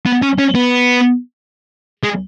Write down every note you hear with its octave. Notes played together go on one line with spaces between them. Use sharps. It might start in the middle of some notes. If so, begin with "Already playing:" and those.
B3
C#4
C#4
B3
G#3